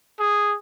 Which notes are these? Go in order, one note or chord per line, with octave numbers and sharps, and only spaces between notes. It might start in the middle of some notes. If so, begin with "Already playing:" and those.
G#4